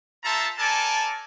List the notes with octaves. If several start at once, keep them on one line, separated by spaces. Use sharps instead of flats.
F4 A4 C5 E5 A5 A#5
A4 A#4 D5 G#5 A5